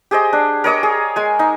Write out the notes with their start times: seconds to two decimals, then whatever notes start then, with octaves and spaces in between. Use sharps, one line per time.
0.11 G4 G#4 C5 D#5
0.33 D4
0.64 A#4 C#5 D#5 D6
0.83 G#4
1.16 G#3 G#5
1.39 D#4